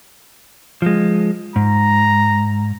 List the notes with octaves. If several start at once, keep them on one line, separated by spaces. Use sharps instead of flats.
F3 G#3
G#2 A#5